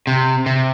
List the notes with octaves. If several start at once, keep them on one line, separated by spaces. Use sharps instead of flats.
C3
C3